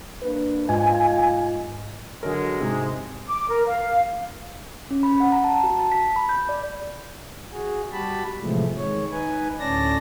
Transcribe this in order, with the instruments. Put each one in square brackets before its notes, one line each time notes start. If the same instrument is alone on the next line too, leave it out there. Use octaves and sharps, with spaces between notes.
[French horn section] A#3 D4 B4
[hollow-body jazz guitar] G#2 [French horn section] F4 D#5 [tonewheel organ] G#5
[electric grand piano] D3 A#4 [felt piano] F#3 [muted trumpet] G#3
[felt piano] G#2 [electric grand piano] C3
[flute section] D6
A#4
F5
[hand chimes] C#4
B5
F#5
A#5
A5
F#4
A5
B6
B5
G6
D5
[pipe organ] F#4 G#4
G3 F#4 G4 A5 B5
A2 C3 E3 F3 G#3 A3
D#3 G#3 C#5
D#4 B4 G#5
D2 A2 C#4 D5 A5 A#6